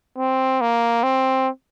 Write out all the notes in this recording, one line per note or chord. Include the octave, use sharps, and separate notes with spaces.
C4
A#3
C4